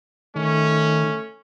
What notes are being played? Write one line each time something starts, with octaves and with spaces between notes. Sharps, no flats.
D#3 A3 C#4